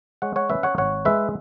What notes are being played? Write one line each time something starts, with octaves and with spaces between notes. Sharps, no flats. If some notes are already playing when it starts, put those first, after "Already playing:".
G#3 C#5 F#5
C#5 F#5
C#4 B4 E5
C#5 F#5
G#1 C#5 F#5
G#3 B4 E5